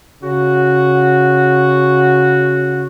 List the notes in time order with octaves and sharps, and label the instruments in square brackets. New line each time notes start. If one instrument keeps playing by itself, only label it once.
[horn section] C#3 F#4